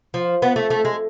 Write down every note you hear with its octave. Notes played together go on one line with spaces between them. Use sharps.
F3
B3
A3
A3
G#3